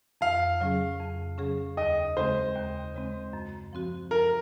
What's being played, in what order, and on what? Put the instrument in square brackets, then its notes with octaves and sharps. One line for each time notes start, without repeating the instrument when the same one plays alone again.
[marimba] F2 [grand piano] F5
[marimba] C#3 F#3 C#4 G#4
F2
C#3 F#3 C#4 G#4
[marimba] D#2 [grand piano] D#5
[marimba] C#3 G#3 C4 [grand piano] C5
[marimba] D#2
C#3 G#3 C4
F#2
F3 C4 F#4
[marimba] F#2 [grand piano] A#4